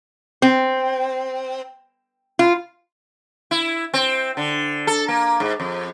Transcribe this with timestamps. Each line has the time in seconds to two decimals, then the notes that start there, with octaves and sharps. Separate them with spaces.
0.42 C4
2.39 F4
3.51 E4
3.94 C4
4.37 D3
4.87 A4
5.08 A#3
5.40 G#2
5.60 F2